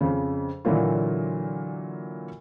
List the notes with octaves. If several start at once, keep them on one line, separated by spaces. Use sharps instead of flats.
F2 C#3
A#2 D3 E3 F#3 A#3 F4